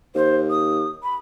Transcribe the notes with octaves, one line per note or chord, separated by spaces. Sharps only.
D#2 C5
D#6
B5